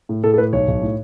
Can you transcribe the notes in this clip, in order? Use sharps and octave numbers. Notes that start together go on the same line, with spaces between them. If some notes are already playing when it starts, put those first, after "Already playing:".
A2
A2 A4
A4
A2 B4
B1 C#5
B1
A2